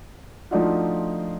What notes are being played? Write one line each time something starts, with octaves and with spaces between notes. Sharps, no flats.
F3 A3 D4 D#4 F4 F#4